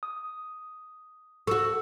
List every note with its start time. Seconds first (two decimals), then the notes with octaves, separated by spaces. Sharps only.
0.03 D#6
1.47 F#4 A4 C#6 E6